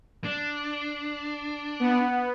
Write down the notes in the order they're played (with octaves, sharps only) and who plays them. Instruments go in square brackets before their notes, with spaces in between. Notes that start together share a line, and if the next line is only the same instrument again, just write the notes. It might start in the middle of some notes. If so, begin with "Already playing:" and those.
[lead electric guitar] D4
[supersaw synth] B3